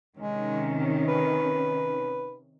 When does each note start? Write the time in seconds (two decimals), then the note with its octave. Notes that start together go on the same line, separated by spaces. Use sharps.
0.17 C3 D#3 G#3 C#4
1.08 B4